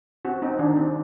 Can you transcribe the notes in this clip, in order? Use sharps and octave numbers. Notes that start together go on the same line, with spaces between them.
C4 F#4
C4 D#4
D#3 D4
C4